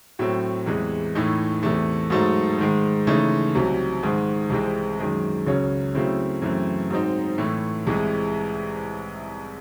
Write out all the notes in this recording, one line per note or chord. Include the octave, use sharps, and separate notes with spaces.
A2 F#3 A3 C4
E2 C3 E3 G#3
A2 E3 A3 D#4
E2 C3 E3 A3
G#2 F#3 A3 D#4
G#2 D#3 G#3
C#3 E3 A3 D#4
C2 C3 F#3
G#2 D#3 G#3
C2 C3 E3 G#3 C4
F#2 D#3 G#3
C#2 C#3 F#3 C#4
C#3 F#3 A3 C4 E4
F#2 C#3 E3 A3 C4
G#2 F#3 C4 D#4
A2 E3 A3
C2 C3 E3 G#3